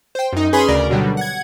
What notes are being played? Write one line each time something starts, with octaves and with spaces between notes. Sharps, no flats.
C5 G5
F#2 D#4
C#4 G#4 B4 G#5 B5 C6
D2 C#3 A#4 D5
B2 D3 F#3 G3
F#5 G#6